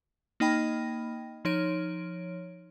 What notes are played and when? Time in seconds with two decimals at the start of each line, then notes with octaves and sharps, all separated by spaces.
0.40 A#3 D#4 D#5 G5 B5
1.45 F3 D#4 C#5 D7